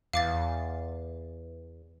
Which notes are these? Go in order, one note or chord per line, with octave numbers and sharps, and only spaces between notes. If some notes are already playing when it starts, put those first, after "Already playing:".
E2 F5 D6 A6